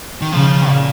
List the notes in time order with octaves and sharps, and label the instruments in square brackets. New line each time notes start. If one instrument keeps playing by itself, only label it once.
[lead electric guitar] D#3
[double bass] C#3 [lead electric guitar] F3
[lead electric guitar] A#2